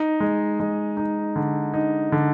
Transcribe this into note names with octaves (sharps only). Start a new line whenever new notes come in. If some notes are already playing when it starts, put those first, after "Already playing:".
Already playing: D#4
G#3
G#3
D#4
D3
D#4
D3